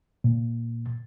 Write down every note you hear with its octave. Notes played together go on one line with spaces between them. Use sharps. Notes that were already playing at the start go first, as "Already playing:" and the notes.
A#2